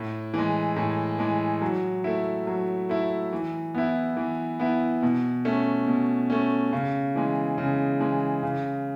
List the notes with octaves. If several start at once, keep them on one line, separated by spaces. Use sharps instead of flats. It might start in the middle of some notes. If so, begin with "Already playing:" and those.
Already playing: A2
E3 G#3
A2
E3 G#3
F#3
A3 E4
F#3
A3 E4
E3
B3 E4
E3
B3 E4
B2
A3 C#4
B2
A3 C#4
C#3
E3 G#3
C#3
E3 G#3
C#3